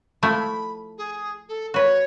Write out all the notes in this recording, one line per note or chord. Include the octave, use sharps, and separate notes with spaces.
F3 A3 E4 B5
G#4
A4
F#4 B4 C#5